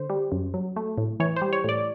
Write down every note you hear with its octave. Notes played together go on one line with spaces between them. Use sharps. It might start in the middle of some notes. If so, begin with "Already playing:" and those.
Already playing: D3 C5
G3
F#2
F#3
A3
A2
E3 C#5
C5
G3
C#5
A2 D5